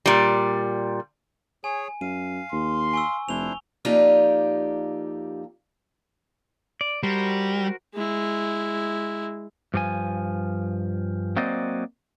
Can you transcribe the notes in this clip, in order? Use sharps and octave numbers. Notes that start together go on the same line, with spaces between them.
A#2 G3
G#4 C#5 G#5
F#2 F5 D#7
D#2 C6
G#5 C#6 E6
F1 D4 E4 C5 F7 G7
F2 A#3 D#4 F4 G4 D5
D5
G3 F#4 A#4 C5
G#3 E4
G2 F3 F#4 G#5
F#3 A#3 C4 C5 D5 D#5